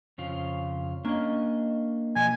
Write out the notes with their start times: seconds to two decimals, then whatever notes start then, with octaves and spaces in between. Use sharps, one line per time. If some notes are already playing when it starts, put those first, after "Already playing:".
0.18 F2 C#3 F4
1.05 A#3 C#4 D4 D#5
2.16 B2 F3 D#5 G#5